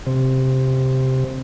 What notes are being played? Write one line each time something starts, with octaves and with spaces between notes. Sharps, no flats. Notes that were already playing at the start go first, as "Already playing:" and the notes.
C3